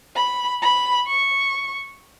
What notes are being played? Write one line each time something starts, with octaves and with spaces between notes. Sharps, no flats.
B5
B5
C#6